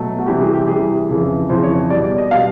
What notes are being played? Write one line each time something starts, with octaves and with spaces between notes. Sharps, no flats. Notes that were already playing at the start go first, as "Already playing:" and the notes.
Already playing: B2 F#3 A3
F#4
C3 E3 G3 G4
G#4
G4
C3 E3 G3 G#4
F2 C#3 E3
F2 C#3 E3 C5
C#5
B2 G3 D5
D5
D#5
B2 G3 F5